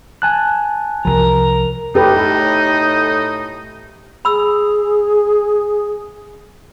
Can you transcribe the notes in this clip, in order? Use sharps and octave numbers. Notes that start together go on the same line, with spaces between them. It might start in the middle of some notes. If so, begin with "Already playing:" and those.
G#5 A5 F#6
C2 F3 A#4 A#5
A2 D#4 G4 A4 B4
G#4 B5 E6